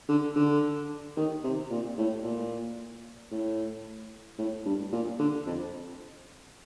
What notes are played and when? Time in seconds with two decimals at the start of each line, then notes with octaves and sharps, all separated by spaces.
0.09 D3
0.35 D3
1.17 D#3
1.44 C3
1.71 A#2
1.98 A2
2.23 A#2
3.31 A2
4.38 A2
4.66 G2
4.93 A#2
5.19 D3
5.46 F2